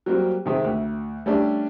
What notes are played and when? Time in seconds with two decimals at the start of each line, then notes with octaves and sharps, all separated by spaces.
0.06 F#3 G3 A#3 C4
0.46 C3 D#3 G#3 C4
0.64 D2 E5
1.26 G3 A3 C#4 D4 G4